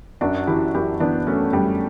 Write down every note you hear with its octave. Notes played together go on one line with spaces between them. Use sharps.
F#2 D4 F#4
E3 E4 G4
F#2 E4 G4
E3 B3 D4
F#2 A3 C#4
F#2 G3